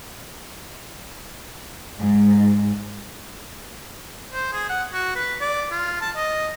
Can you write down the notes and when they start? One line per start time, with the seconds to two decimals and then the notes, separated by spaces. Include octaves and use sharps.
1.99 G#2
4.33 C5
4.53 G#4
4.69 F#5
4.93 F#4
5.15 B4
5.40 D5
5.71 F4
6.01 A5
6.16 D#5